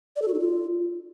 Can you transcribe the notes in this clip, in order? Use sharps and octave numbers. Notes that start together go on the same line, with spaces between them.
D5
A4
F#4
D#4
F4